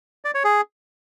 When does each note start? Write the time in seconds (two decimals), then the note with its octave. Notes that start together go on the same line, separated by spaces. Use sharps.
0.25 D5
0.34 C#5
0.44 G#4